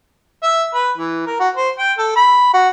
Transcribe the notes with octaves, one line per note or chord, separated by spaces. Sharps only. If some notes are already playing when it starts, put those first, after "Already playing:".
E5
B4
E3
A#4
F#4
C5
G5
A4
B5
F#4